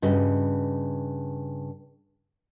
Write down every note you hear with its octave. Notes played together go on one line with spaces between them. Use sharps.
G2 C#3 F#4 D#5